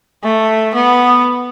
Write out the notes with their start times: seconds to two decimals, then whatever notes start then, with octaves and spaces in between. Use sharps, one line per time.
0.24 A3
0.75 B3